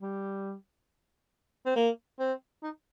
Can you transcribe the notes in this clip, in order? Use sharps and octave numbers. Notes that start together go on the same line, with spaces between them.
G3
C4
A#3
C4
D#4